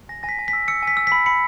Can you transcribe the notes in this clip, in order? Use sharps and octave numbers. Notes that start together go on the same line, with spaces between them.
G#5 A#6
G#5 A#6
B6
G#5
B6
E6
E6 C#7
G#5
B6
E6
B6
B5
B5 C#7